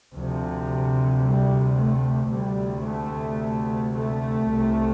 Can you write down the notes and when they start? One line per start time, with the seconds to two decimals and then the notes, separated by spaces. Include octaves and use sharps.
0.13 D2 C3 F3
1.21 G3
1.77 A3
2.30 D2 C3 G3
2.85 A3
3.94 A3
4.49 C2 C3